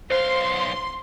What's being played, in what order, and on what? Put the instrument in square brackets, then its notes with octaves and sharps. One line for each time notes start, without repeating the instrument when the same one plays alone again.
[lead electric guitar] B1 F5 [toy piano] C5 [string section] C6